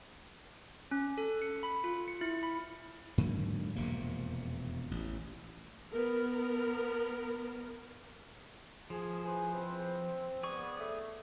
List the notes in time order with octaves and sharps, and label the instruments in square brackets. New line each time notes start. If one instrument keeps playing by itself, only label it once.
[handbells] C#4
A4
C#7
B5
F4
C#7
E4
B5
[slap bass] G#2 D3 F#3 A#3
E1 F2 C3 A#3
A1
[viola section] B3 A#4
[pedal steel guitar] F3 [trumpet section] G#4
[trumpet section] E4 B4 C5 [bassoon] G#4
[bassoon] C4
[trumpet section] B3 D5 [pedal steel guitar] G#4 C#6
[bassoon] A3